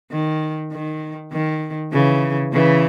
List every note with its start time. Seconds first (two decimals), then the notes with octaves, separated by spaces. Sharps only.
0.11 D#3
0.71 D#3
1.32 D#3
1.93 C#3 E3
2.52 C#3 E3